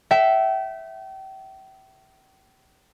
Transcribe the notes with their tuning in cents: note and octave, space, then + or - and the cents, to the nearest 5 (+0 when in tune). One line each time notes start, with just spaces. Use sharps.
E5 +0 G5 -35